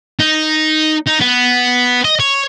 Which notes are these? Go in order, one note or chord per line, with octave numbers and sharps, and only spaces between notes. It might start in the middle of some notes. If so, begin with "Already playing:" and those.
D#4
D#4
B3
D#5
C#5